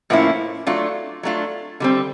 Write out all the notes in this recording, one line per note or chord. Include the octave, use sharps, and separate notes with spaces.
A2 F3 A#3 C#4 E4
F#3 A3 D4 F4
F#3 A3 D4 F4
D3 G3 C4